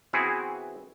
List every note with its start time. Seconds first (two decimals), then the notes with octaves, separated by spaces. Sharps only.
0.13 E3 B3 C4 E4 F#4 G#4